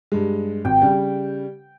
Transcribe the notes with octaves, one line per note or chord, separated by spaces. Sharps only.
G2 G#3
G#1 G5
C#3 G3